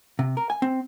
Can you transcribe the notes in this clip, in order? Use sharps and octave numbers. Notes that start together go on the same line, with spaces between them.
C3
A#4
G#5
C4